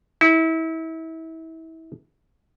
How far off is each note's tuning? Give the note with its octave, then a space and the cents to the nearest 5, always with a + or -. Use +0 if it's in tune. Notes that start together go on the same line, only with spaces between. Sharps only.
E4 -30